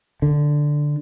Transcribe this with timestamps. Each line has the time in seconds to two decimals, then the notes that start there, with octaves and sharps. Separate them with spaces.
0.22 D3